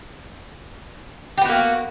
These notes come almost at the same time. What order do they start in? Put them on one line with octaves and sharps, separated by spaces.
G4 B3 F#4 A#3